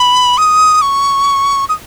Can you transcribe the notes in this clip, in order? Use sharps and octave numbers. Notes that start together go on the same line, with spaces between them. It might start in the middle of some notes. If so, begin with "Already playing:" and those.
Already playing: B5
D#6
C#6
D#6